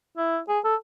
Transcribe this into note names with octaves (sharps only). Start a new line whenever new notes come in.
E4
G#4
A4